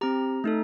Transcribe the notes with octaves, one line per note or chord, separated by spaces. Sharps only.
C4 G4 A#5
A3 D#4 A4